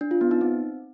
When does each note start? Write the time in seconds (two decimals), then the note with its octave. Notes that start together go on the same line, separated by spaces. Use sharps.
0.01 D4
0.11 F4
0.21 B3
0.31 D#4
0.41 C4